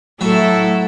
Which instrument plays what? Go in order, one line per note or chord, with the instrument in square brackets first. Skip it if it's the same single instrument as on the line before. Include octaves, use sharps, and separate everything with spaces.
[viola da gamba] A2 E4 A4 [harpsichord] F#3 [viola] A3